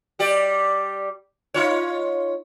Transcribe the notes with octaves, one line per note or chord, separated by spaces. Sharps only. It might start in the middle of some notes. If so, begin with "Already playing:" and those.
G3 G4 D5
D#4 F4 C#5